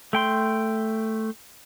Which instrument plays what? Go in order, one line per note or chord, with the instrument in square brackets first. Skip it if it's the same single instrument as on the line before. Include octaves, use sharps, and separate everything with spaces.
[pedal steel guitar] A3 G5 C6